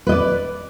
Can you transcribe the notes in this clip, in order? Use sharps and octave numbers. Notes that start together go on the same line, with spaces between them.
B4 D5 D#5